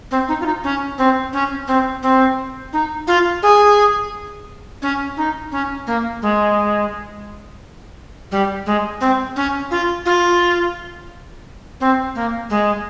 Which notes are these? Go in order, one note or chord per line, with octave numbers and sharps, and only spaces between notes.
C4
D#4
F4
D#4
C#4
C4
C#4
C4
C4
D#4
F4
G#4
C#4
D#4
C#4
A#3
G#3
G3
G#3
C4
C#4
F4
F4
C4
A#3
G#3